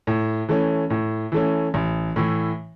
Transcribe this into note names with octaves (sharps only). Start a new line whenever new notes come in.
A2
E3 A3 C#4
A2
E3 A3 C#4
A1
A2 E3